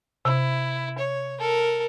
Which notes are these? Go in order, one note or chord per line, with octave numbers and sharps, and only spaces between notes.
C3 E4
C#5
A4 A#4